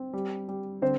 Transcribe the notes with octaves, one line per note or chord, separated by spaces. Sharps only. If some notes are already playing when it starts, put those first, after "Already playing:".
Already playing: C4
G3
G3
D3 C4 C5